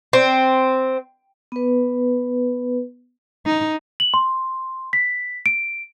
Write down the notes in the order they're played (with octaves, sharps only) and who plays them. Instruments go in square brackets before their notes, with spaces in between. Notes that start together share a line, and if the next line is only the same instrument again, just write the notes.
[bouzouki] C4
[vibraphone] B3 B4
[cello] D#4
[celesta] F#7
C6
B6
D7